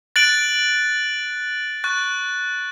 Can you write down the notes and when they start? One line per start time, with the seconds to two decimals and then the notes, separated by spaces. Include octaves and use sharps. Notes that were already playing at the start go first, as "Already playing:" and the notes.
0.16 F#6 A6 D7 F#7
1.84 C#6 F#6 A6